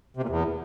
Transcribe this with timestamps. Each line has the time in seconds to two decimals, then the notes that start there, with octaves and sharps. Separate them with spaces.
0.17 C3
0.23 A#2
0.29 E2